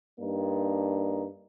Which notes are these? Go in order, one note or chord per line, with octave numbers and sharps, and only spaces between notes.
G2 A#3 D4 D#4